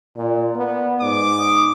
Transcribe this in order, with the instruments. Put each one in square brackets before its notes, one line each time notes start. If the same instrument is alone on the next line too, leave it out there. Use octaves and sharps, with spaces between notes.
[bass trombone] A#2 [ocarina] D5
[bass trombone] B3
[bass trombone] G#2 [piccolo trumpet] D6
[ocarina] D#6